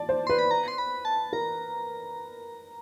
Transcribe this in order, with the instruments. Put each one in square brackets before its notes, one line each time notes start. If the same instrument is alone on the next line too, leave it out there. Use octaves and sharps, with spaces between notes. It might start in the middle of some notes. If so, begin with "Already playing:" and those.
Already playing: [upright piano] D5 [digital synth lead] A5
[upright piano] C5
[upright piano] B4 [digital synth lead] C6
[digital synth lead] B5
A#5
C6
B5
A5
[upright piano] A#4 [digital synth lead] A#5